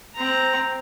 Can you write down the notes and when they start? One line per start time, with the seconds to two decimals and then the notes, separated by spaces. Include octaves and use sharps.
0.15 C4 A#5